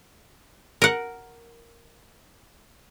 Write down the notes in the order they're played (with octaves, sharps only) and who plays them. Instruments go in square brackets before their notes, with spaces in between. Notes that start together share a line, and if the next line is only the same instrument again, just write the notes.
[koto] A#4 F#5